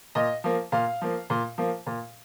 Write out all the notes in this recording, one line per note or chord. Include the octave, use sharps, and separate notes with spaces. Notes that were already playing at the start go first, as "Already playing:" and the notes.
A#2 D#5
F3 A#3
A#2 F5
F3 A#3
A#2
F3 A#3
A#2